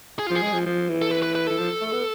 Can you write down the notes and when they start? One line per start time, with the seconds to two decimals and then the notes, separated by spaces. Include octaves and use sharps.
0.19 G#4
0.27 F4
0.30 F3 G#4
0.42 G#3
0.53 F3
0.66 F3
0.89 E3
1.02 A4
1.11 B4
1.23 B4
1.35 B4
1.47 E3 A4
1.58 F3
1.81 A3
1.93 B3